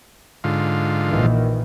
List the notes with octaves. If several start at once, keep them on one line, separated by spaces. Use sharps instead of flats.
G#2 D3 F4
A#1 D#3 E3